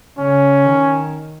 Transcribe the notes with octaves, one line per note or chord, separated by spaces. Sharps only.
C#3 C#4
D#3